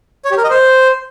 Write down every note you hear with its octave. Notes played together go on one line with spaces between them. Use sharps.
C#5
G4
A#4
D#5
C5